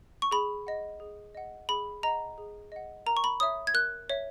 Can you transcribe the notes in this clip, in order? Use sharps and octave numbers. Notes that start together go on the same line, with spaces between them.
C#6
G#4 B5
D#5 F#5
G#4
D#5 F#5
G#4 B5
D#5 F#5 A#5
G#4
D#5 F#5
A#4 A#5
C#6
B5
C#5 E5 D#6
G#6
A#4 F#6
C#5 E5